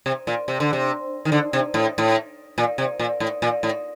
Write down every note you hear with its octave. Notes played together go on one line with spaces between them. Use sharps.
C3
A#2
C3
D3
C3
D#3
D3
C3
A2
A2
A#2
C3
A#2
A2
A#2
A2